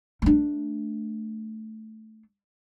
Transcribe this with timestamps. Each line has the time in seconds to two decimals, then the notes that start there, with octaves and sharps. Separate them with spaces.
0.22 A3 D4